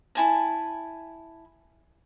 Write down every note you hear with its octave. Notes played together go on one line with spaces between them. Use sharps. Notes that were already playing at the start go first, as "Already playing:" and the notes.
E4 G#5 A5